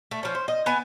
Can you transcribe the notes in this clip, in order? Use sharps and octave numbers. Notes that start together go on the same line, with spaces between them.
A3
F3 C#4
C5
D#5
B3 G#5 A5